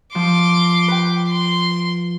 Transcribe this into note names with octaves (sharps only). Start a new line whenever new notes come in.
F3 C6 D6
B4 G5
C6